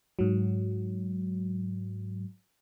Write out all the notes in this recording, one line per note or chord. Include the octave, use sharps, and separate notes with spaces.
G#2 F#3